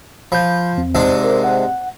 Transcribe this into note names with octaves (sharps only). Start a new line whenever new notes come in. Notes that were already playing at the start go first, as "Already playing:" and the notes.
F3 B5 G6
E2 C4
G#2 C3 D4
A#4
F#5